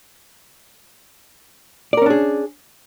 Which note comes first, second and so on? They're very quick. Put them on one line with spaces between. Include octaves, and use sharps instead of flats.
D5 A#4 C#4 D4 G#4